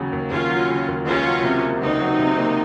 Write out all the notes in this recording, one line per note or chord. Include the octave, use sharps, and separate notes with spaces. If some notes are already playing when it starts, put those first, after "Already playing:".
Already playing: D#2 C#3 F#3
D#2
D#2 C#4 F4
F#3
C#3
D#2
C#2 C#4 F4
F#3
C3
A#3
C#2 C4 D#4
F#3
C3
A#3